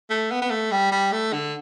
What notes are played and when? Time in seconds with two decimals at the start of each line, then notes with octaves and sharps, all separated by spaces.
0.10 A3
0.31 B3
0.42 B3
0.50 A3
0.71 G3
0.92 G3
1.12 A3
1.32 D3